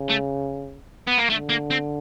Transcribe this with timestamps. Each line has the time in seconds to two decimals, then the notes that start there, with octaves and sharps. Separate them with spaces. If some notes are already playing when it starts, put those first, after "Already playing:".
Already playing: C#3
0.09 A3
1.07 B3
1.18 A#3
1.30 D3 A3
1.49 A#3
1.70 C4